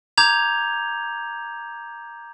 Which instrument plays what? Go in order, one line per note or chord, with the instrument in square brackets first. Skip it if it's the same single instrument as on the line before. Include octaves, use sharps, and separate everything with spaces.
[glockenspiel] A#5 D6 G6 G#6 F7